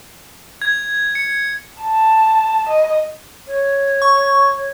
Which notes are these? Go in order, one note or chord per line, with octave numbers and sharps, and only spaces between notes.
G#6
C#7
A5
D#5
C#5
C#6